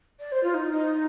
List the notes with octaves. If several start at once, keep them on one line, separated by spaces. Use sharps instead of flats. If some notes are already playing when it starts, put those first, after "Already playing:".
D5
C5
F4
D#4
D#4